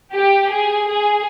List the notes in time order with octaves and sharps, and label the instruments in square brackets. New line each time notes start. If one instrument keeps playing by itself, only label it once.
[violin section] G4
G#4
G#4